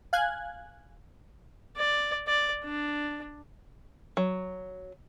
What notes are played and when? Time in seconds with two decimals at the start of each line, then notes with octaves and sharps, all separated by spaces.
0.13 F5 G#5 F#6 G#6
1.77 D5
2.27 D5
2.64 D4
4.17 F#3